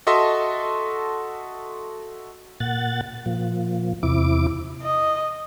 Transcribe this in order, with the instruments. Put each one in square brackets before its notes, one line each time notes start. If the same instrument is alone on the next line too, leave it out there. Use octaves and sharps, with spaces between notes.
[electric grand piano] F#4 A4 D#5 E5 A5 C6
[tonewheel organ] A#2 F#5 A6
A#2 F3
E2 C3 E4 D6
[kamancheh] D#5